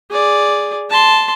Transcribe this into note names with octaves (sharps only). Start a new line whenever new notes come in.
G#4 D5
A5 C6